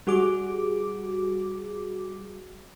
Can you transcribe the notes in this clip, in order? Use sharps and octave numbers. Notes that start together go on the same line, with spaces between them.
G3 F#4 G#4 D6